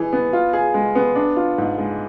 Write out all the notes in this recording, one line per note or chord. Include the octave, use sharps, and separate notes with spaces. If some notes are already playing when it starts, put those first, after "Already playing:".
Already playing: E3 G#4
B3
F4
G#4
G#3
B3
D4
F4
G#2
G#3